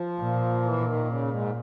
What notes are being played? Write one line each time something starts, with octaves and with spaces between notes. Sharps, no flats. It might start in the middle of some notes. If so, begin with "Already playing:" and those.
Already playing: F3
A#2
E3
D3
D#3
C#3
G#2